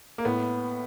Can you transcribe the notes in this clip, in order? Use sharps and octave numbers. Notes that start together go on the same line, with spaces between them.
A#3
A2 B3